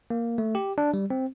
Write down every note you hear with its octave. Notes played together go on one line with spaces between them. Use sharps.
A#3
A3
G4
D4
G3
C4